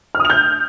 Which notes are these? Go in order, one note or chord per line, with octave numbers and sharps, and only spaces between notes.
F6
D#6
F7
G6